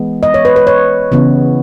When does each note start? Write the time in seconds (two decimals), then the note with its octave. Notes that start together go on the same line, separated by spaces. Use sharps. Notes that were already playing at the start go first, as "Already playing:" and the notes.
Already playing: E3 G#3 B3
0.23 D#5
0.34 C#5
0.45 B4
0.56 B4
0.67 C#5
1.12 C#3 E3 B3